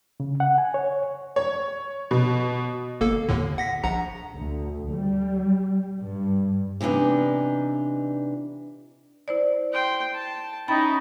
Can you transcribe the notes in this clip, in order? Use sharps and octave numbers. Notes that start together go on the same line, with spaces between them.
C#3
F#5
G#5
C#5
C#5
B2
G1 A#3 A4
D#2 A2 D3
F#5 A#6 B6
A#1 F#5 A#5
D2
G3
G2
C3 E3 B3 D4 D#4
E4 C5 D5
G5 C6
A5
C#4 D#4 E4 D#5 G5 B5 A6